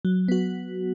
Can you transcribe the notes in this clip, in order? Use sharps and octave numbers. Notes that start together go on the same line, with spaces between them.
F#3
B3 F#4